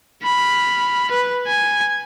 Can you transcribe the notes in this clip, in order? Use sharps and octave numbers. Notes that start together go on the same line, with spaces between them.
B5 F6
B4
G#5